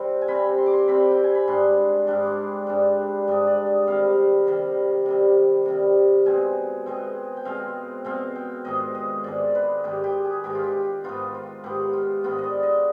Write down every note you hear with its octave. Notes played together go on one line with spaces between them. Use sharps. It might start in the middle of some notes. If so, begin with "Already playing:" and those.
Already playing: C3 G3 C4 F5
G#5
C3 G3 C4 B5
C6
D6
C6
C3 G3 C4 B5
G5
G#5
B5
G#2 G3 D4 C6
G#2 G3 D4
C6 D6
G#2 G3 D4
G#2 G3 D4 D#5
D5
D#5
C3 D#3 G3 F5
C3 D#3 G3
C3 D#3 G3
C3 D#3 G3
B2 G#3 C4 G#5
B2 G#3 C4
G5
B2 G#3 C4 F5
B2 G#3 C4 F5
G5
G#2 D#3 G#3 D#5
D#5
G#2 D#3 G#3 D5
B4
G#2 D#3 G#3 G4
G4
G#4
G#2 D#3 G#3 G4
F4
G4
G#2 D#3 B3 F4
F4
G#2 D#3 B3 G4
F4
G#2 D#3 B3 F4
D#5
D5
D#5